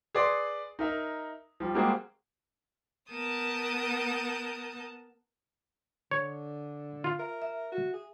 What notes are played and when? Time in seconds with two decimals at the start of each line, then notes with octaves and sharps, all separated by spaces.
0.15 G#4 B4 D5 C6
0.79 D#4 A#4 E5
1.60 F3 G3
1.75 G3 G#3 A#3 C4 F#4 G#4
3.11 B3 A#4 A5 D#6 G6
6.11 D3 C#5
7.04 F4 F5
7.19 A#4 E5
7.42 E5
7.72 F#4
7.94 G#4